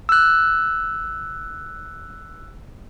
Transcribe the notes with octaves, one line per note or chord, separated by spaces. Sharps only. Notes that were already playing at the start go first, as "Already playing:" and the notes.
E6 F#6